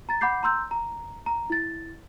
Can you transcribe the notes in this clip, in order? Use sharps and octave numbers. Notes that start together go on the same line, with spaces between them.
A#5 A6
F#5 B5 D6 G6 C7
A#5 C6 E6 G6
A#5
A#5
E4 A6